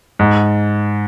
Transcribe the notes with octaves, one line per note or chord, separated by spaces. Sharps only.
G#2